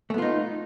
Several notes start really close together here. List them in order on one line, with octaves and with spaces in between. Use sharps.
A3 B3 F4 D#4